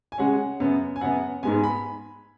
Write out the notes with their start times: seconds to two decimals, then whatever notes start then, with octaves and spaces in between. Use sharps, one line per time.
0.12 G#5
0.18 C#3 G#3 C#4 F#5
0.60 F#2 C#3 B3
0.96 G#5
1.01 F#2 C#3 B3 F#5
1.43 G#2 G#3 B3 G#5
1.64 B5